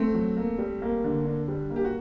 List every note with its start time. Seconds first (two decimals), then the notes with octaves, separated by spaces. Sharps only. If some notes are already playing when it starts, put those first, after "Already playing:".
Already playing: A3 C4
0.14 F#3
0.37 A#3
0.58 G3
0.82 A#3
1.04 D3
1.25 D4
1.48 G3
1.70 A#3
1.76 G4
1.84 F#4